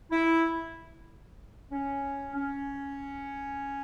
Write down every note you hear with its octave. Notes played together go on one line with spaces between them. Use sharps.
E4
C#4
C#4